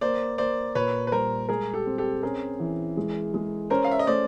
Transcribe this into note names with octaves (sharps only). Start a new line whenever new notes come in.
A#3 C5 D5
A#3 C5 D5
A#2 B4 C#5
B4
G3 A#4 C5
G#3 G#4 A#4
G4 A4
C4
G4 A4
C#4 G#4 A#4
E3
G#3
G#3
C#4 A#4 C5
F5
E5
D#5
A3 C5 D5